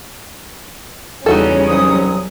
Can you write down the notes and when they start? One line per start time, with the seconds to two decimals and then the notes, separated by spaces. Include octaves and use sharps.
1.26 E2 C#3 G3 C#4 D#4 F#4 A4
1.69 C2 F#3 D#6